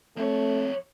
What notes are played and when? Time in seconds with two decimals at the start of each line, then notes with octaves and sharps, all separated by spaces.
0.17 F2 A3 C4 C#5